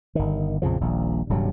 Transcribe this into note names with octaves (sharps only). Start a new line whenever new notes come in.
G1 D#3
A#1 F2 C#3 F3
D#1 A#1
D#1 G2 C3 F#3